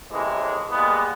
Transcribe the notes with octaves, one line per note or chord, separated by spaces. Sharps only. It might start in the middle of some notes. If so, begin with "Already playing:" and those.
A1 A2 C3 E3 G#3 A#3
G3 G#3 A#3 B3